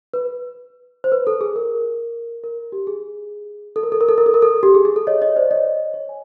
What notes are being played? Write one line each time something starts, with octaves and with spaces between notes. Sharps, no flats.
B4
C5
B4
A4
G#4
A#4
A#4
G4
G#4
A4
A#4
A4
A#4
A4
A#4
A4
A#4
A4
G4
G#4
G#4
A4
C#5 D#5
C#5 D#5
C5 D5
C#5 D#5
C#5
G#5